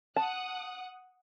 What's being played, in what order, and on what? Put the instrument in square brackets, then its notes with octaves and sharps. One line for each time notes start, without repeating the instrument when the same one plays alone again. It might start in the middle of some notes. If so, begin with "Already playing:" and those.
[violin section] F#5 D#6 F#6 [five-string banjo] A5